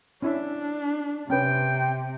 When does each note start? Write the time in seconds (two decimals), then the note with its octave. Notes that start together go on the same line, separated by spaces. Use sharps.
0.22 C#4 D4 E4 E5
1.30 C3 C#4 B4 G5